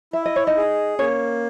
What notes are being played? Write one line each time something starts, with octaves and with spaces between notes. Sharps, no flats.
E4 E5
D#5
C#5
D#4 D#5
G#4
A#3 C#4 C#5